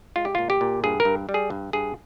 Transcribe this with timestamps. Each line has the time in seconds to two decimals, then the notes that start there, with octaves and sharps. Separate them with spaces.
0.16 G#3 F4
0.25 G4
0.35 A#2 F4
0.50 G4
0.61 A#2
0.84 G2 G#4
1.00 A#4
1.05 G2
1.29 G3
1.34 G#4
1.50 G2
1.73 G2 G#4